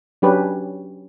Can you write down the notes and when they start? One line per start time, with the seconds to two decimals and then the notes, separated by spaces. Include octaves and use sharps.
0.22 F#3 C#4 D4 G4 B4 C#5